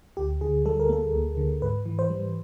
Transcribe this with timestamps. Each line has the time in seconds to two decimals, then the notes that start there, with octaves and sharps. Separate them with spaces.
0.17 D2 G4
0.41 D3 G#4
0.66 G3 A4
0.80 A#4
0.89 A#3 A4
1.13 D2
1.37 D3
1.62 G#2 B4
1.86 E3
1.99 C5
2.10 G3